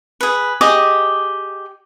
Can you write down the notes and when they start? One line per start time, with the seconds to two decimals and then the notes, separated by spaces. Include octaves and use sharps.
0.21 G#4 B4
0.61 G4 G#4 D#5 D6